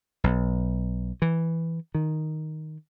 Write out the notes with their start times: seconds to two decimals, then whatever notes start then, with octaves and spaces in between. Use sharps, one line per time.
0.24 B1
1.22 E3
1.95 D#3